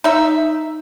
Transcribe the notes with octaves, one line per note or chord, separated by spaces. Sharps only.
D#4 E5